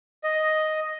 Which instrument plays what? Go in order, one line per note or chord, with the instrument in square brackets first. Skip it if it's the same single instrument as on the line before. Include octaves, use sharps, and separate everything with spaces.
[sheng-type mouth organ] D#5